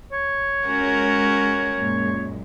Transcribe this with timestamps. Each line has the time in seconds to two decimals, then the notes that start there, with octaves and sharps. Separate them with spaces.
0.13 C#5
0.67 G#3 C#4 F#4 A#4
1.77 F#2 A#2 G#3